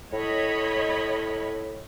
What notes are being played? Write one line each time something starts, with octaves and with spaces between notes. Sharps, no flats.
A2 C#5 D#5 B5